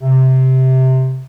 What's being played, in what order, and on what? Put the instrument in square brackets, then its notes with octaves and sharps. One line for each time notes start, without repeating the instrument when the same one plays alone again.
[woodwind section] C3